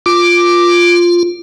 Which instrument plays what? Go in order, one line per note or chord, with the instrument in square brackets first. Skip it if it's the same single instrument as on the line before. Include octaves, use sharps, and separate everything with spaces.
[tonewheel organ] F4 [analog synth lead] D6